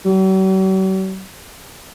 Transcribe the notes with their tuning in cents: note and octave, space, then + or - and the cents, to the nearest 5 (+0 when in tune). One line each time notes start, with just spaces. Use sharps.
F#3 +45